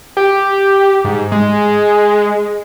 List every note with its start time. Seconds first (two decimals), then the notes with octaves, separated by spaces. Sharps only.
0.17 G4
1.05 G#2
1.32 G#3